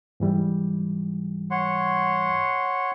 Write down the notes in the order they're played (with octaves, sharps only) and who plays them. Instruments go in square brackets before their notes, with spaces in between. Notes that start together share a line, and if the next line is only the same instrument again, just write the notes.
[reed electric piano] G#2 E3 G3
[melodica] C#5 F#5 C6